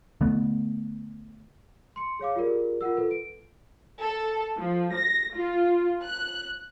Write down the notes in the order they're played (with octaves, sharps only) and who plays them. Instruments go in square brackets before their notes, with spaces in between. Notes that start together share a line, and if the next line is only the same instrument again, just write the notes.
[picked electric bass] D3 A3 B3
[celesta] C6 C#7
G#4 C#5 F5 D6
F4 G4 G#4 A#4 D5
F4 A#4 F#5 E6
F4 A4 B4
D7
[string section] A4
F3
A#6
F4
F#6